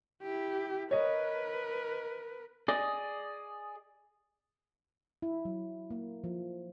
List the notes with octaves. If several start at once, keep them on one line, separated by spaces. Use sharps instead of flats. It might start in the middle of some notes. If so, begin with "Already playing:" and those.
E4 G4
A#4 B4 C#5 D#5
G#4 D5 D#5
E4
F#3
A#3
F3